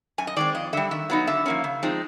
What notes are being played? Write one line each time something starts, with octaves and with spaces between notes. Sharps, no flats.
F#2 G#5
D#5
D#3 G#3 C4 D5
F2 D#5
D3 G3 E5
D#3 E5
F#3 B3 D#4
D3 E5
F3 A#3 C#4
C#3
F3 G#3 C4 D#4